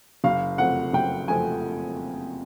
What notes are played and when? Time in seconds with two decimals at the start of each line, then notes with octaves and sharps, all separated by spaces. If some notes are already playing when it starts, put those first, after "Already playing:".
0.24 F#1 F5
0.58 F2 C3 F3 A3 F#5
0.93 F#1 G5
1.28 F2 C3 F3 A3 G#5